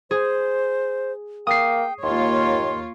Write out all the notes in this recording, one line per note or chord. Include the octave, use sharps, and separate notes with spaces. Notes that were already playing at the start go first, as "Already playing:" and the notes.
G#4 C5
A#3 G5 D#6 C7
D#2 A#3 F4 C#5 C6